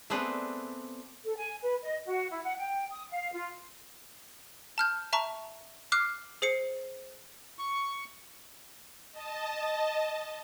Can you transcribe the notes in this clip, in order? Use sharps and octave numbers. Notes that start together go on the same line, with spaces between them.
A3 B3 C4 D4 G#4 B4
A4
G#5
B4
D#5
F#4
E4
F#5
G5
D#6
F5
F4
A5 F6 G6
E5 A5 A#5 C#6
D6 F6 F#6 C7
G#4 C5 C7 C#7
C#6
D#5 A5